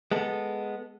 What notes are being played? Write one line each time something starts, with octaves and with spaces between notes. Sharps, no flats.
G#3 B3 A4